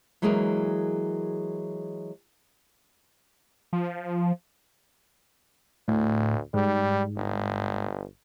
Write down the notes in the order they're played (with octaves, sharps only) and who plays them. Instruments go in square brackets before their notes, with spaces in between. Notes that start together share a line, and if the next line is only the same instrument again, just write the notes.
[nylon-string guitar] E3 F#3 G#3 A#3 G#4 A#4
[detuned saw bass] F3
[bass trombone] D2 [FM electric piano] A2
[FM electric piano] G#2 [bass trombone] G3
[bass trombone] G1